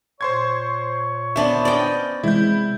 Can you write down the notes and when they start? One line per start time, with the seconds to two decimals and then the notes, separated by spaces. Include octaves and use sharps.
0.21 A#2 C5 C#5 C6 C#6 G#6
1.36 B3 D4 C5 E5
1.65 C#4 D5 D#5 G5
2.23 C3 E3 G#3 E4 G6